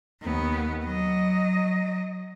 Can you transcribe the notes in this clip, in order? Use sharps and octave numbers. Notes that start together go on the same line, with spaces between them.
D#2 B3
F#3 D#5